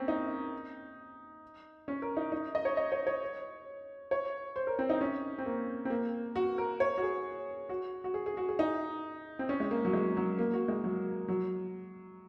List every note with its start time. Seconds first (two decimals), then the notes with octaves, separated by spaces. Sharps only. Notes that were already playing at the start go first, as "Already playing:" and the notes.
Already playing: A#3 C4 C#4
0.08 D#4
1.88 C#4
2.02 A#4
2.17 D#4
2.32 D#4
2.55 D#5
2.65 C#5
2.77 D#5
2.92 C#5
3.07 C#5
4.11 C#5
4.56 C5
4.67 A#4
4.79 C4
4.89 D#4
5.01 C#4
5.38 C4
5.46 A#3
5.85 C4
5.90 A#3
6.36 F#4
6.58 A#4
6.80 C#5
6.98 F#4
7.02 G#4
7.69 F#4
8.04 F#4
8.14 G#4
8.26 G#4
8.37 F#4
8.49 G#4
8.59 D#4
9.39 C4
9.49 C#4
9.60 G#3
9.71 A#3
9.85 F#3
9.93 G#3
10.17 F#3
10.39 A#3
10.53 F#4
10.68 G#3
10.84 F#3
11.28 F#3